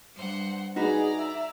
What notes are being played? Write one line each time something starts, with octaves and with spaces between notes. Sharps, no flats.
G2 C5 F#5
D#4 F#4 G#4 B4 D5 A#5
E5